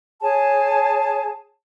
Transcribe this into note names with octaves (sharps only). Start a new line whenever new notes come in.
G#4 C#5 G#5 A5